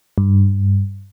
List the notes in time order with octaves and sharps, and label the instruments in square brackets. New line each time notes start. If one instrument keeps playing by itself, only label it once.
[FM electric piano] G2